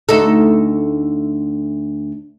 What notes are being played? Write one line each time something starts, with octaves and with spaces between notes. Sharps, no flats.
D2 D#4 A4